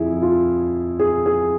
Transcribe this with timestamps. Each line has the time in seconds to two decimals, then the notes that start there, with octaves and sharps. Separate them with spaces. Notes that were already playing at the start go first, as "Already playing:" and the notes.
Already playing: F2 F3 E4 G#4
0.22 F4
0.99 G#4
1.26 G#4